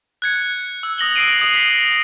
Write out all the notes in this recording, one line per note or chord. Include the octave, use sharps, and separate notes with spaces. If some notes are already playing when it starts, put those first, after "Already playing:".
F#6 G#6 C#7
E6
D#6 A#6 F#7 G7
D#6 E6 C7 D7 D#7
D#6 C7 F#7
B6